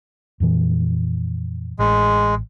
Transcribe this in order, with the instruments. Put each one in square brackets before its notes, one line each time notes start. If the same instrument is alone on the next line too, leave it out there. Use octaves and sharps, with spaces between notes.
[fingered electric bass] F2 A#2 E3
[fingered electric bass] A1 [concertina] G#3